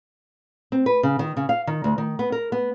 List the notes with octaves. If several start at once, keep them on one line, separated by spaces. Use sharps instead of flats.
C4
B4
C#3
D#3
C#3
F5
D#3
D2
D#3
B3
A#4
B3